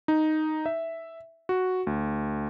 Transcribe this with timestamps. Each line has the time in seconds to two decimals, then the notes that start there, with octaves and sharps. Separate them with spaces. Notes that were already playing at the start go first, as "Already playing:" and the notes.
0.08 D#4
0.66 E5
1.49 F#4
1.87 D2